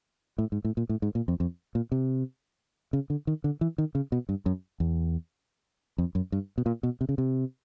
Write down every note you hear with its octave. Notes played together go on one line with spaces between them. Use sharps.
A2
G#2
A2
A#2
A2
G#2
A#2
F2
F2
A#2
C3
C#3
D3
D#3
D3
E3
D#3
C#3
B2
G2
F#2
E2
F2
F#2
G2
B2
A#2
B2
C3
C#3
C3